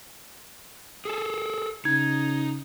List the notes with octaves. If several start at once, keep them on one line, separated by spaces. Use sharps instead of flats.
G#4 A4
C#3 D#4 G#6